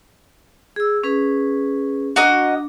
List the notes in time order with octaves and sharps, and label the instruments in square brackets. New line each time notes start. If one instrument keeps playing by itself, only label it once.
[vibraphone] G#4 E6
C#4 G#4 B4
[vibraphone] D4 [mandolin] F#4 A#4 D#5